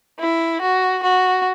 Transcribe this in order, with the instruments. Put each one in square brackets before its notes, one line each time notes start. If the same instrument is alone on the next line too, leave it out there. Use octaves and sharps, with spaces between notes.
[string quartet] E4
F#4
F#4